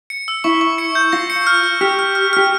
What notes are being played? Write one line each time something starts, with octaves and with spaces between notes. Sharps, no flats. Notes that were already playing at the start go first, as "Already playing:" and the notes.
C#7
E6
E4 C#6
C#6
C#7
G6
F4 A#6
C#7
F6
F6
G4 F6
F6
F6
G4 F6